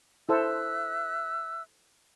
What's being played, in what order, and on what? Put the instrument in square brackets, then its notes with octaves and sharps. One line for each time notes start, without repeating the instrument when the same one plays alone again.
[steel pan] E4 A4 C5 [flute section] E5 E6 F#6